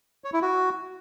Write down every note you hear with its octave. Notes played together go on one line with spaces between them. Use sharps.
C#5
E4
F#4